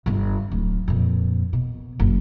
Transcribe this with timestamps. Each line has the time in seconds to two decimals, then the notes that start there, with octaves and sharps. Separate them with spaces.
0.06 G1 D3
0.52 D1
0.88 F2 A#2
1.53 B2
2.00 F#1